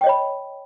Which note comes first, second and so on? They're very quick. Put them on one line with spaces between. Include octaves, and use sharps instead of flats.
G5 D#5 C#5 B5